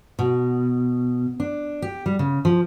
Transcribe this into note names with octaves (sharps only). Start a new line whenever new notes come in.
B2
D4
G4
G3
C#3
F3